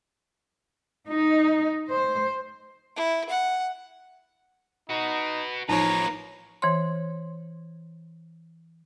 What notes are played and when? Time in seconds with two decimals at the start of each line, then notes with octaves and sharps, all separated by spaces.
1.08 D#4
1.88 C5
2.96 E4
3.30 F#5
4.89 D#4 F#4 B4
5.69 A1 F3 A#3 D#4 B4 C#5 A#5
6.62 E3 C5 C#5 C6